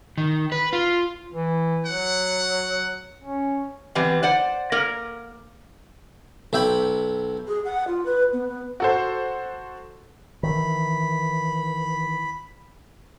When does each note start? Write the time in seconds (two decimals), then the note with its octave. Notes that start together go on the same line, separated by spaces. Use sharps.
0.18 D#3
0.52 B4
0.73 F4
1.33 E3
1.86 F#3 F#5
3.23 C#4
3.95 E3 G3 B3 C4
4.23 C5 D5 F#5
4.72 A#3 A#4
6.53 B1 E5 G5 B5
7.47 G#4
7.64 F#5
7.87 F4
8.05 B4
8.32 B3
8.48 B3
8.80 F#4 A4 C5
10.43 D#3 E3 B5